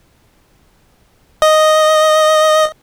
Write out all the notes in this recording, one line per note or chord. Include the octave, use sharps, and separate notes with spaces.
D#5